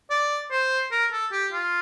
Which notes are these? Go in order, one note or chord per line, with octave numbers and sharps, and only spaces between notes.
D5
C5
A#4
A4
G4
F4